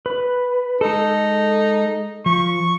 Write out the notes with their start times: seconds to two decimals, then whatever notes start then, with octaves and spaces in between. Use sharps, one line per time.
0.06 B4
0.81 G#3 D#4 A4
2.26 F3 C#6